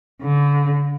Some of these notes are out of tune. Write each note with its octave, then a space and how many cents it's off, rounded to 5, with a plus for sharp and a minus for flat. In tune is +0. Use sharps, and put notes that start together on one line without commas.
D3 -35